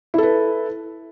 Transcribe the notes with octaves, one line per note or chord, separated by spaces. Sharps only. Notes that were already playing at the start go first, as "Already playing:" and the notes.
E4 A4 B4